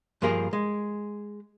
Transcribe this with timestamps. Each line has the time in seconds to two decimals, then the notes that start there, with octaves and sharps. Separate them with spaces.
0.22 G2 F3 A#3 F4 G#4 A#4
0.53 G#3